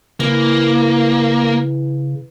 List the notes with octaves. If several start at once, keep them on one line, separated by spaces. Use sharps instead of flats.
C#3 E3 A#3